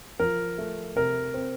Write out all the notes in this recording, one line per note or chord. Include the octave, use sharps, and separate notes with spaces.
F3 A#4
A3
C3 A#4
C4